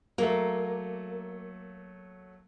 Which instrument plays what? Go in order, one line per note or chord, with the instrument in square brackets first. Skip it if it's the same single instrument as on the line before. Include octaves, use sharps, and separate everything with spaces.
[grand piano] F#3 A3 [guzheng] A#3